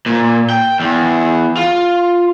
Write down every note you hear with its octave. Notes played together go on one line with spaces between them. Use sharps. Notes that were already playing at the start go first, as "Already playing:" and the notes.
A#2
G5
E2
F4